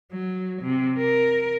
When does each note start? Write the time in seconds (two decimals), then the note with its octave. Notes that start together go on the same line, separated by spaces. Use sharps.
0.12 F#3
0.62 C3
0.99 A#4